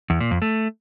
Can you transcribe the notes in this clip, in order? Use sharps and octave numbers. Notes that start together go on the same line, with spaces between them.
E2
A#2
F2
A3